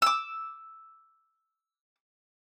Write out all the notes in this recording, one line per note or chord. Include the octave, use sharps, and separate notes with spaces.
D6 E6